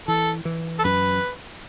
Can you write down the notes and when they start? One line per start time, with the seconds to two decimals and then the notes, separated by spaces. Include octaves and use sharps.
0.08 E3 A4
0.45 E3
0.79 A4
0.84 F#2 B4